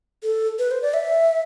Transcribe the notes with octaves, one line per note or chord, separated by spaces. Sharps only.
A4
B4
C5
D5
E5